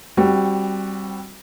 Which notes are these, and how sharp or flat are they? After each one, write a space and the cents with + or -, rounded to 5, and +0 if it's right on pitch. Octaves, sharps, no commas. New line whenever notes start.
G3 +0 C4 +25 F#4 +0